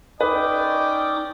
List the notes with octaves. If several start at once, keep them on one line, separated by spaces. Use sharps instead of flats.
C#4 D#4 B4 D5 D#5 G5 D6 D#6